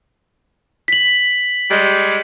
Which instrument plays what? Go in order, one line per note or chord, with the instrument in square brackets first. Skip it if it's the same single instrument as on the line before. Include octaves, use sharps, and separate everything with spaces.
[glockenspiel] B6 F#7
[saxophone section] G3 G#3